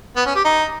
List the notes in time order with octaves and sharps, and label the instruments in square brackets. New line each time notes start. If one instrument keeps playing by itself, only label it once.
[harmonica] B3
C#4
G4
D#4